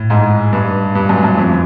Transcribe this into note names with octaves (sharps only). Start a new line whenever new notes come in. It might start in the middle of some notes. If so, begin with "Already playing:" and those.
Already playing: A2
G#2
G2
G2
F#2
F#2
F2